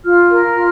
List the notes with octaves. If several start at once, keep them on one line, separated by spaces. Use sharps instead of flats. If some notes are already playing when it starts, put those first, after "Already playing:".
F4 F6
A#4
F4